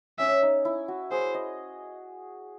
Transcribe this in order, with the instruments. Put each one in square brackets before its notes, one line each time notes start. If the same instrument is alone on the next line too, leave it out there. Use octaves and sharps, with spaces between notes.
[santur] C#4 [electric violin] E5
[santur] D#4
E4
F#4
[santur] G#4 [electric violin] C5
[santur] D#5